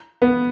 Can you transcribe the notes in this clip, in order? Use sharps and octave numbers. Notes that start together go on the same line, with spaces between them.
B3